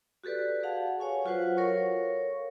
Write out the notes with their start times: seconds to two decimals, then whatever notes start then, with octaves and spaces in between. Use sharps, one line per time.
0.24 F#4 G4 A4 B4 D5
0.63 G4 G#4 F5 F#5 A5
0.99 C#5 F5 G#5 C#6
1.25 F#3 F4 F#4 B4 C5 F#5
1.57 A4 A#4 C#5 F5 C#6